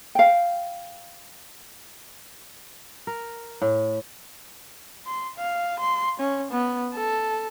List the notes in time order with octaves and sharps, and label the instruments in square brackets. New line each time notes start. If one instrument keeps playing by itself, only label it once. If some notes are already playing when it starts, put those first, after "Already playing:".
[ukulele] F5 G5
[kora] A#4
A2
[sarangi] C6
F5
C6
C#4
B3
A4